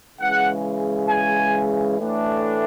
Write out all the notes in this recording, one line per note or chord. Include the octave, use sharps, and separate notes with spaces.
C#3 E3 G#3 F#5
G#5
A2 E3 A3 D4